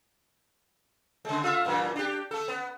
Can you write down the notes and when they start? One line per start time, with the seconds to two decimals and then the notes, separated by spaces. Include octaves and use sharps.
1.25 C#3 G#3
1.42 A3 F4 E5
1.65 F#2 A#2 E3
1.96 D4 G4
2.31 A3 A4
2.48 B3